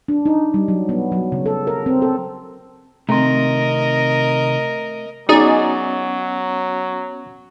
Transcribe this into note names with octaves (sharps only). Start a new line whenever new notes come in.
D4
D#4
G3
F#3
B3
F#3
C#3
A4
A#4
C4
A4
C3 D#3 A3 C4 A#4 D#5 A#5
F#3 B3 C#4 D#4 F#4 G#4 D5